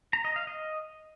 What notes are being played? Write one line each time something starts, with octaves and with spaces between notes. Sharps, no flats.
A#5
D#5
F5
D#5